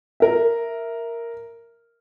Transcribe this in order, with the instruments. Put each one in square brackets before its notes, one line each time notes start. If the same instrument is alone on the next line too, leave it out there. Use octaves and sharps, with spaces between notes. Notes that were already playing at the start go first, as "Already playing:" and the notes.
[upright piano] A#4 E5